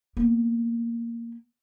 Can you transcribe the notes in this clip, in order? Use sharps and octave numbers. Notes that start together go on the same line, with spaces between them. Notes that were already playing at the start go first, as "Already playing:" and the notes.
A#3 B3